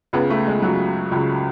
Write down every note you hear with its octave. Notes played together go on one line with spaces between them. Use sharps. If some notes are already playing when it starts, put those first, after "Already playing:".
C#2 C#3 B3
A3
G#3
C#2 C#3 F#3
C#2 C#3